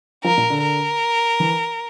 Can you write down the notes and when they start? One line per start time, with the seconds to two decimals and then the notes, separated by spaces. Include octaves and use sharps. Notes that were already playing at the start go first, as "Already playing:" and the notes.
0.24 F3 A#4
0.37 A#2
0.50 D3
0.62 A#4
1.40 E3